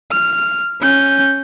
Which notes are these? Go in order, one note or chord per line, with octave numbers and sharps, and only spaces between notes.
F6
C#4 G6